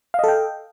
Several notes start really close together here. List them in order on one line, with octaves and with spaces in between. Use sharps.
F5 D#5 A4 G5